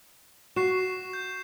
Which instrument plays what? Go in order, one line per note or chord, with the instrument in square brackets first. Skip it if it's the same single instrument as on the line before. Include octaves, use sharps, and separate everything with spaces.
[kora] F#4 [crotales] C#6 C7 E7
[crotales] G6